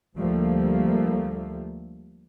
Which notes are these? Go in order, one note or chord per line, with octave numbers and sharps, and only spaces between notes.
D2 F3 G3 A3 A#3